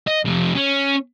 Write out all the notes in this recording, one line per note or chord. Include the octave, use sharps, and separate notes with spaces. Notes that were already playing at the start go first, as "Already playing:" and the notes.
D#5
F2 C3
C#4